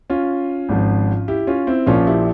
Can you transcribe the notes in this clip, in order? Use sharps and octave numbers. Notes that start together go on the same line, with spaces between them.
C#4 F4
G#1 G#2 F3
E4 G4
C#4 F4
C4 E4
A#1 A#2 F3 C#4 F4
E4 G4